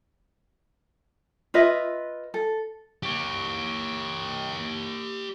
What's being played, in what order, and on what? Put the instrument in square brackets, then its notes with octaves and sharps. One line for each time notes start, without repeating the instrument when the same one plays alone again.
[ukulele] F4 B4 D#5 E5
A4
[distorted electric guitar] G4 C#5